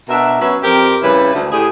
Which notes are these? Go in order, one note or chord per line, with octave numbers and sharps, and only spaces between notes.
B2 D4 A#4 E5
F#3 B3 C#4 B4 E5
F2 C4 G4 A#4
C#3 G3 E4 B4
D2
A2 G4 G#4